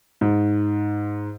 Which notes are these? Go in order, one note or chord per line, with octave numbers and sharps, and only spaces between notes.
G#2